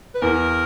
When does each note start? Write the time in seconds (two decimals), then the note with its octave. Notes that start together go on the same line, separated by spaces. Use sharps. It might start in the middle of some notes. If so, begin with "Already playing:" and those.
0.15 B4
0.22 E2 A#4